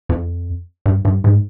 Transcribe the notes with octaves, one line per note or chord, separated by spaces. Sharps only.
F2
G2
G2
G#2